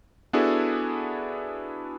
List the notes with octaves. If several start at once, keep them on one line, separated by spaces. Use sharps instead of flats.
B3 D4 E4 F#4 G#4 A4